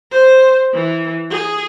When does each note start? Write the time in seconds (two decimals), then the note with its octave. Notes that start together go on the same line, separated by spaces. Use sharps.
0.11 C5
0.74 E3
1.30 G#4